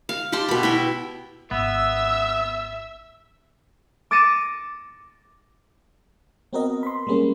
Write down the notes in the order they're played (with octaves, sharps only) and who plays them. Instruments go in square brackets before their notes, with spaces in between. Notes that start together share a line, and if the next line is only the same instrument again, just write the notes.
[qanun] F5
G4 G5 A5 C6
B2 B5
E4 E5 G5
[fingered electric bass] G#1 [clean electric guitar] B3 [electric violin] E5 [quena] E6
[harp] D6 A6 A#6 C#7 D#7 E7
[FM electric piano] B3 C4 F#4 A#4 B4 D#5
B5 C6
G3 G#3 A#3 C#4